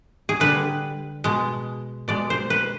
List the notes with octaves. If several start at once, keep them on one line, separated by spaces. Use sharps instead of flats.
G#4
D3 G3 B4
B2 G#3
B2 G#3 D5
C5
B4